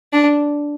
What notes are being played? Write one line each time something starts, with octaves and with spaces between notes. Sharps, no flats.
D4